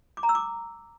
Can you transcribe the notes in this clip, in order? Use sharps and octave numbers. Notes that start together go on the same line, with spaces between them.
D6
A#5
E6
D6